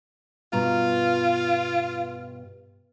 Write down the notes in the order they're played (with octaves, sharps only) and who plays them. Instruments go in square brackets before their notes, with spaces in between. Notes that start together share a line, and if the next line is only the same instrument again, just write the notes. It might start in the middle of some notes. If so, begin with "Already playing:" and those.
[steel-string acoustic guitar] G2 B2 A#5 [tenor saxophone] F4